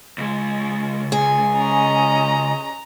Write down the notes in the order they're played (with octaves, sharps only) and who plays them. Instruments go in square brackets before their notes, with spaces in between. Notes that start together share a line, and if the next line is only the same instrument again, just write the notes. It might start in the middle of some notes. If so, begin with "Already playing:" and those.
[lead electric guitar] C#2 G#3
[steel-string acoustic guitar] G#4
[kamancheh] C#4 D#5 [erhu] A#5